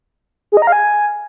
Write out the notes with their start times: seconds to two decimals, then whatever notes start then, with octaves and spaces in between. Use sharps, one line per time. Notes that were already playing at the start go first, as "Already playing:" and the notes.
0.52 G#4
0.57 D#5
0.62 A#5
0.67 F5
0.72 G#5